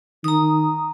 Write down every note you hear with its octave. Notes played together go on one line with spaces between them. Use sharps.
D#3 A#5 D#6